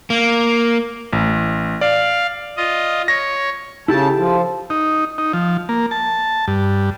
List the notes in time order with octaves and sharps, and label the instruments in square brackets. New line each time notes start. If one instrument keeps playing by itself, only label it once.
[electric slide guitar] A#3
[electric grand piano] A1
[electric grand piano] D5 [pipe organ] F5
[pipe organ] F4 D#5
[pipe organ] C#5 [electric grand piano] A#6
[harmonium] C#3 A5 [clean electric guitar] E4 G4 A4
[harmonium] F3
[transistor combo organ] D#4
D#4
F3
A#3
A5
G2